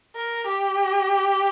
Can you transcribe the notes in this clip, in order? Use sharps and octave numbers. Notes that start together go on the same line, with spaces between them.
A#4
G4